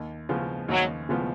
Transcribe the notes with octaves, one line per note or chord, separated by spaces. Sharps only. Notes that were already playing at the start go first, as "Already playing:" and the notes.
Already playing: D#2
C#3 F3 B3 F4
D#2 F#3
C#3 F3 B3 F4